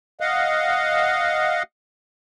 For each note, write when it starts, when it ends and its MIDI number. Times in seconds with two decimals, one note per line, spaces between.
0.20 1.63 75
0.20 1.63 77
0.20 1.63 78